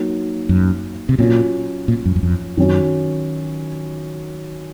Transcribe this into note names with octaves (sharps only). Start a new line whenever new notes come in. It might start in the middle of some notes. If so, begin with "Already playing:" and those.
Already playing: F#3 A#3 D#4
F#2
C3
A#2 F#3 C#4 F4
A#2
F#2
F#2
F2
F#2 D#3 F#3 C#4 F#4